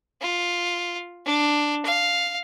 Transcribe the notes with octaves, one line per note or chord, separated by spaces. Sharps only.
F4
D4
F5